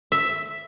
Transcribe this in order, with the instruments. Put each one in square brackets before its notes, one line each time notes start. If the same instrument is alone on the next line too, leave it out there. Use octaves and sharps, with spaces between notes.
[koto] E5